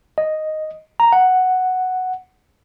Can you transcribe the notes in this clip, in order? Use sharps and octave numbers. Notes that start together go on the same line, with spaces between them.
D#5
A#5
F#5